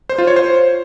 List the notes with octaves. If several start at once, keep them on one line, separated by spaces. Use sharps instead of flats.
C5
F4
C#5
C5